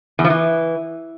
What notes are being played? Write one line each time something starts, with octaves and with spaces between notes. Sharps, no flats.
E2
F3
E3